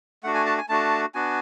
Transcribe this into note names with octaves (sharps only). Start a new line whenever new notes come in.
A3 D4 F#4 F#5
G#5
A5
G#5
A3 D4 F#4 A5
B3 D4 F#4 G#5